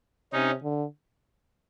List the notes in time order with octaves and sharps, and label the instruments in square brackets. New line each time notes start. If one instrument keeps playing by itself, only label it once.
[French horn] C3 [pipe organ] C#4 D#4
[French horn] D3